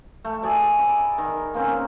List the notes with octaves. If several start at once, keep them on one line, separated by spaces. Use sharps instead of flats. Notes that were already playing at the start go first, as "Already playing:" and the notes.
A3
G#4 D5 E5
D5 A#5 B5 D6
D#3
A#3 C4 C#4